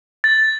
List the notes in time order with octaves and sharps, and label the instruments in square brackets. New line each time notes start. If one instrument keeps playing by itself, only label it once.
[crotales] A6